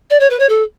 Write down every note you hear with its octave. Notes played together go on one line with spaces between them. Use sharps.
D5
C#5
B4
C#5
A4